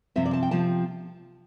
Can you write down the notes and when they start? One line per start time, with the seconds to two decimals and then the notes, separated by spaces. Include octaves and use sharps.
0.16 C3 F3 C4 E5
0.26 D5
0.33 A5
0.43 G5
0.51 C3 F3 C4 A5